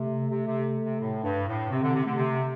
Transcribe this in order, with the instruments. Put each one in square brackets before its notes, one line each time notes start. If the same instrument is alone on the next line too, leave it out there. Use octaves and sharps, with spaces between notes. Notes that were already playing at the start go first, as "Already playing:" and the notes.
Already playing: [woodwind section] C3 [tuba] A3
[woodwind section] C3
C3
C3
A2
G2
A2
[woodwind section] C3 [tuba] C4
[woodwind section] D3
C3
[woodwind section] D3 [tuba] A3
[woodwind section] C3